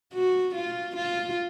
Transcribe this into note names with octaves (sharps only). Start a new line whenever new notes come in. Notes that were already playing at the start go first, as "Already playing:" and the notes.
F#4
F4
F4